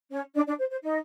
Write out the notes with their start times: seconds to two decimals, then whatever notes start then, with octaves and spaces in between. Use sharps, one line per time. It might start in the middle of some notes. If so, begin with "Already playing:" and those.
0.11 C#4 C#5
0.35 D4 D5
0.47 D4 D5
0.59 C5
0.70 C5
0.83 D#4 D#5